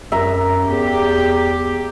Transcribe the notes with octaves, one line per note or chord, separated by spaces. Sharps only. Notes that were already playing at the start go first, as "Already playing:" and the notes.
F#2 E5 A#5
E2 G4